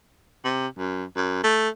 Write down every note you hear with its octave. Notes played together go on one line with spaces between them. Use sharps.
C3
F#2
F#2
A3